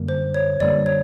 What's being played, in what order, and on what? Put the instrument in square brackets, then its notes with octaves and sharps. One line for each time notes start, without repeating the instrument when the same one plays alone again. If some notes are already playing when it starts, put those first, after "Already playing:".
Already playing: [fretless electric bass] F#2 D3 G3 A#3
[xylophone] C5
C#5
[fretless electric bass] F#2 D3 G3 A#3 [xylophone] D5
[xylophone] C#5